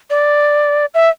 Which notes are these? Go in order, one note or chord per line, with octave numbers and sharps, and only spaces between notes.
D5
E5